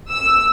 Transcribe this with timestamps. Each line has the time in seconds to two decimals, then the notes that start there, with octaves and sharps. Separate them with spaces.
0.10 E6